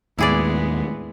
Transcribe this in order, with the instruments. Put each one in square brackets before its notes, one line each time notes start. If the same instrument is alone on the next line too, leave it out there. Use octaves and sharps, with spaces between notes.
[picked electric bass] D#2 A2 [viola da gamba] G#3 B3 [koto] E4 G#4 D5